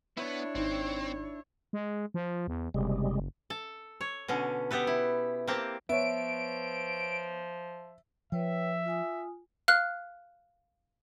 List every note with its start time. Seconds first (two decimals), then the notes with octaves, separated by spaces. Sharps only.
0.17 B3 D4 E4 C#5
0.55 G#1 C4 D#4
1.73 G#3
2.14 F3
2.47 E2
2.74 F#1 C3 G3 G#3
3.50 A4
4.01 C#5
4.28 B2 D3 C#4
4.71 B3 G4 A4 B4
4.87 E4
5.48 A#3 C4 G4 A5
5.89 F3 B3 C#5 E5 D7
8.32 F3 B4 C#5 E5 G5
8.86 F4 G#5 D#6
9.68 F5 F6 F#6